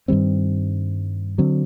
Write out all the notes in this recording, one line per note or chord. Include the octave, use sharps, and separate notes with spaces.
G2 D#3 G3 C4
D3 F#3 C4